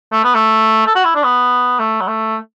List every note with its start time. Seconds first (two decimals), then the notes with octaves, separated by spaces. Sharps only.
0.12 A3
0.24 B3
0.35 A3
0.86 A4
0.95 F#4
1.05 E4
1.15 D4
1.24 B3
1.79 A3
2.01 F#3
2.08 A3